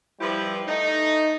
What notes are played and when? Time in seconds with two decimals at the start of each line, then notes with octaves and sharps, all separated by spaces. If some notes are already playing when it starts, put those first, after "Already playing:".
0.20 F3 G3 E4 G4 B4 C5
0.66 A3 D#4